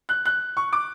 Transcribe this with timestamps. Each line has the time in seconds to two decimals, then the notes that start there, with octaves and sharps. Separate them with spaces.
0.09 F#6
0.25 F#6
0.57 C#6
0.73 D6